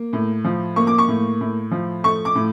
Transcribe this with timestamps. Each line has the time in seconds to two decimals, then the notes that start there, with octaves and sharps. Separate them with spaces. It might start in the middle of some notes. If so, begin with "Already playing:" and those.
Already playing: A#3
0.13 A2
0.44 F3
0.76 A#3 C#6
0.87 D6
0.98 C#6
1.08 A2
1.41 A2
1.71 F3
2.04 A3 C#6
2.25 D6
2.35 A2